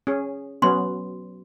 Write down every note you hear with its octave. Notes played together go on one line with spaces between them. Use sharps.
C#4 G#4
F#3 B3 C#4 C6